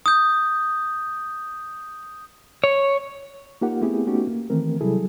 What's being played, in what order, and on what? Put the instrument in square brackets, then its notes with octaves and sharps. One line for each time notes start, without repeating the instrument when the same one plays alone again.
[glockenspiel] D#6 G6
[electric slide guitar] C#5
[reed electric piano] A#3 D#4 F4 G4 A#4 F#5
A3 B3 C4 E4 G4 G#4
A3 B3 C#4 D#4 F#4 G4
A#3
D#3 E3 A3 C4 A#4
C3 F#3 G3 E4 G#4 A4